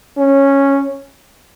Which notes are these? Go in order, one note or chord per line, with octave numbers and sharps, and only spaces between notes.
C#4